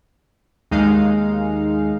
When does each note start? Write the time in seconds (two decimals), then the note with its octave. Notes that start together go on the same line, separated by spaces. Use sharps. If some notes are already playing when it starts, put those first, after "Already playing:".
0.71 D#2 G#3 D#4 F5